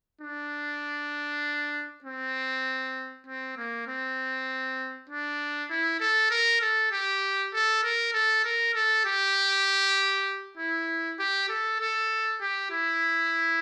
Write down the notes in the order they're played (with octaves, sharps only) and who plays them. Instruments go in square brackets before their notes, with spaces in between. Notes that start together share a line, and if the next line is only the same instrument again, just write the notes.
[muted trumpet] D4
C4
C4
A#3
C4
D4
E4
A4
A#4
A4
G4
A4
A#4
A4
A#4
A4
G4
E4
G4
A4
A4
G4
E4